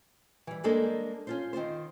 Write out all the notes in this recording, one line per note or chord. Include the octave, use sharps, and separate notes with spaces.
E3 G3
G3 G#3 A#3 D4 A4 C5
C#4 F4 C5
D#3 C4 F4 C5